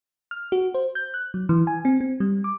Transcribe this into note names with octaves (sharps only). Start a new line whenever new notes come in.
F6
F#4
C5
G6
F#6
F#3
E3
G#5
C4
C4
G3
D6